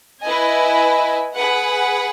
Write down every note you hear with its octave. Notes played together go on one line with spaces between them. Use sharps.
E4 B4 D#5 G#5
G#4 B4 F#5